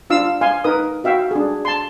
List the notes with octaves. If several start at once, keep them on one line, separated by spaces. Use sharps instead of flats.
D4 F4 F5 E6
F5 G#5 C6
D#4 A#4 B4 D#6
F#4 E5 F5 G5
D4 G#4
A5 C6